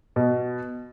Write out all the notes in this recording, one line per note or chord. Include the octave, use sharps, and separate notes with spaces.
B2